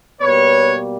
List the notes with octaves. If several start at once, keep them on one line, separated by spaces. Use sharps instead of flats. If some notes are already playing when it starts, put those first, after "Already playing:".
B2 G3 A#3 B4 C#5